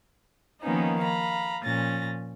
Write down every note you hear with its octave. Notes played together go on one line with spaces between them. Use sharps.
D#3 F3 A#3 B3 C#4 D#4
F5 A#5 B5
A#2 F3 C#4 A6 A#6